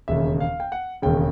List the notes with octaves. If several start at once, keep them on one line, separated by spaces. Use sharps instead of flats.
E1 D#2 C#3 E5
F5
G5
F#5
E1 D#2 C#3 G5